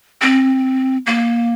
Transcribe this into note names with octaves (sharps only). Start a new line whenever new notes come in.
C4
A#3